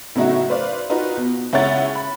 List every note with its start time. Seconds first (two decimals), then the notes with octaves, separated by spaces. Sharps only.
0.15 A2 C#3 F#3 D#4 E4 F#4
0.50 B4 C5 D5 F5
0.90 D#4 F4 F#4 B4
1.17 B2
1.53 C#2 C#4 E4 C#5 F#5 A6
1.95 B5